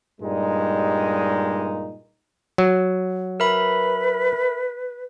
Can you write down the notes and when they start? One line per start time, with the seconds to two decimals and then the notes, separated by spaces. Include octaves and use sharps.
0.20 G2 A#2 G3 G#3 D#4
2.58 F#3
3.40 A#4 B4 E5 B5